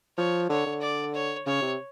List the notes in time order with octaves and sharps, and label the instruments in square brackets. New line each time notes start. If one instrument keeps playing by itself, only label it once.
[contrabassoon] F3 [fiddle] C#5
[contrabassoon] D3 [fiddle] C#5
[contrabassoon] D3
[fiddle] D5
C#5
[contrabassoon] C#3 [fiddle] C#5
[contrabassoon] C3